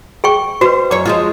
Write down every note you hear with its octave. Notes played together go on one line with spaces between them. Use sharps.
G#4 G5 C#6
F#4 B4 C5
F#2 C#5
F3 G#3 F4